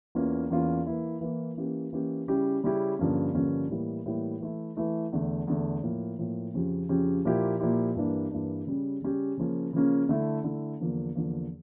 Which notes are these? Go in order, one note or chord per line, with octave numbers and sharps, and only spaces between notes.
E2 E3 A#3 C#4 F4
E2 E3 A#3 C#4 F4
E3 A#3 E4
E3 A#3 E4
E3 A#3 C#4 G4
E3 A#3 C#4 G4
C#3 G3 C#4 E4 G4
C#3 G3 C#4 E4 G4
G2 D3 F3 A#3 C#4
G2 D3 F3 A#3 C#4
A2 E3 G3 A#3 E4
A2 E3 G3 A#3 E4
E3 A3 E4
E3 A3 E4
E2 D3 A3
E2 D3 A3
A2 F3 A#3
A2 F3 A#3
F2 C#3 F3 C#4 G4
F2 C#3 F3 C#4 G4
A#2 F3 A#3 E4 G4
A#2 F3 A#3 E4 G4
G2 E3 A#3 D4
G2 E3 A#3 D4
C#3 G3 C#4 G4
C#3 G3 C#4 G4
C#3 F3 A#3 C#4
C#3 F3 A#3 C#4
D3 A3 E4
D3 A3 E4
E2 D3 F3 A#3
E2 D3 F3 A#3